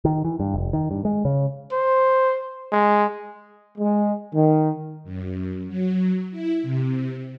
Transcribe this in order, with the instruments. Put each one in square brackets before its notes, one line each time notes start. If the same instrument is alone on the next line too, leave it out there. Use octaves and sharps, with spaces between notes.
[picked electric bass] D#3
E3
G2
F1
D#3
G2
G#3
C#3
[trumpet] C5
G#3
[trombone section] G#3
D#3
[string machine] F#2
F#3
E4
C3